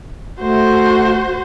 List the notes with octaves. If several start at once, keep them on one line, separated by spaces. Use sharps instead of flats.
A3 F#4 C5